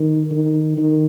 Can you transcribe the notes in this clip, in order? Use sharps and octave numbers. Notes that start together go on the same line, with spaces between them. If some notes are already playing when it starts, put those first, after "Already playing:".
Already playing: D#3
D#3
D#3